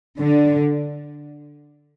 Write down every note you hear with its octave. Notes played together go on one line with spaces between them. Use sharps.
D3